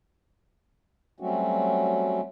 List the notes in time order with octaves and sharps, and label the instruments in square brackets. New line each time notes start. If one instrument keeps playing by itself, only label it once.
[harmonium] F#3 G3 A3 C4 C#4 F#4